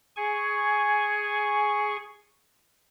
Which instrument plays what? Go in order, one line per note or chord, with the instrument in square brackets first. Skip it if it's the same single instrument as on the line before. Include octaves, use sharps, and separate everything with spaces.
[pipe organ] G#4 G#5 C#6